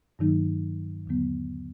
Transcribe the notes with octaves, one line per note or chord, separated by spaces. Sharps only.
G2 D#3 F#3 A#3 D#4
D#2 D3 F#3 B3